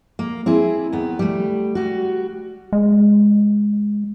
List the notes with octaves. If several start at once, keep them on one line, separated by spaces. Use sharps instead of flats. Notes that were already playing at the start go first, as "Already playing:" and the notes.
A#3
C4 E4 G#4
D#2 B3
G3 A3
G3 F#4
G#3